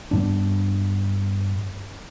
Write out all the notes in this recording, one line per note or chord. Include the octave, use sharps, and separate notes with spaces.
G2 B3 D4